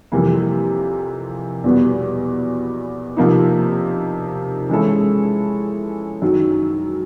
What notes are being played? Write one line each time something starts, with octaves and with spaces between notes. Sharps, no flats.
F2 C3 E3 G3 A#3
E2 B2 G3 B3
C3 F3 A#3 D#4
E3 G#3 C#4 E4 A4
F#2 D#3 F#3